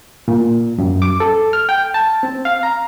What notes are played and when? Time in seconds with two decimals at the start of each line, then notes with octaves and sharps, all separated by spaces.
0.28 A#2
0.78 F#2
1.02 D6
1.20 A4
1.53 F6
1.69 G5
1.94 A5
2.23 C4
2.45 F5
2.63 A#5